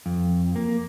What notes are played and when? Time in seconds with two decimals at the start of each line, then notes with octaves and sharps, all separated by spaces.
0.06 F2
0.56 A#3